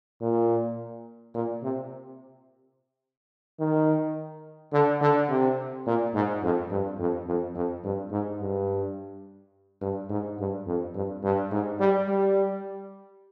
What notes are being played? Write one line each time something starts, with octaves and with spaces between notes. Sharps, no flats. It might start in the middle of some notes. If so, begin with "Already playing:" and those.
A#2
A#2
C3
D#3
D3
D3
C3
A#2
G#2
F2
G2
F2
F2
F2
G2
G#2
G2
G2
G#2
G2
F2
G2
G2
G#2
G3
G3